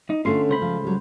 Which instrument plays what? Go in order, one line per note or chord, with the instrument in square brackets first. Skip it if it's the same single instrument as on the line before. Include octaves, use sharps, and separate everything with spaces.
[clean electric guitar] D#4
[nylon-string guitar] D3 A3 C#4 [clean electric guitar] F4 C6
[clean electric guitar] C#2 C5 B5
[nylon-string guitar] F3
F#3 G3